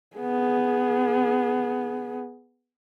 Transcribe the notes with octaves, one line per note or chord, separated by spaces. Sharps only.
B3 G#4